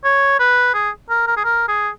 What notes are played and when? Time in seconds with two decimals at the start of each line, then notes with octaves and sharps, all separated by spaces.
0.04 C#5
0.40 B4
0.74 G#4
1.10 A#4
1.27 A#4
1.37 G#4
1.44 A#4
1.68 G#4